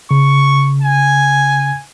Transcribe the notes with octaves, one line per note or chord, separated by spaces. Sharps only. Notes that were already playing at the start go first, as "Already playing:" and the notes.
C#3 C#6
G#5